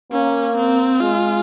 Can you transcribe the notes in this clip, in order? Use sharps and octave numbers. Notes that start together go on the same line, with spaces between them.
A#3 C#4
C4
G#3 F4